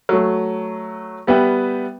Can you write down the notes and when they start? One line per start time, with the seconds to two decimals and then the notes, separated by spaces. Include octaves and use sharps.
0.09 F#3 A3
1.27 G3 B3 B4 E5 G5